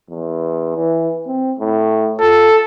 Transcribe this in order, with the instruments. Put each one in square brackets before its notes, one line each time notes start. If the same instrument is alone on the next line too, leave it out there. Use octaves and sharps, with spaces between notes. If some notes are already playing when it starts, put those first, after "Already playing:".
[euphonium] E2
E3
C4
A2
[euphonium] F4 [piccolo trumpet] A4